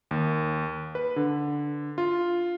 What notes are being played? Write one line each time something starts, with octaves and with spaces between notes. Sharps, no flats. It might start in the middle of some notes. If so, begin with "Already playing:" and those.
D#2
B4
D3
F4